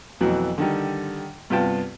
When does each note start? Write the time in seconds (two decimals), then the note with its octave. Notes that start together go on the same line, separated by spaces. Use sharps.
0.21 F2 B2 E3 F#3
0.58 D3 D#3 G3
1.50 G2 C3 B3 F4 G5 A5